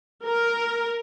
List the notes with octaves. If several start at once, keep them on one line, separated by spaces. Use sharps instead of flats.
A#4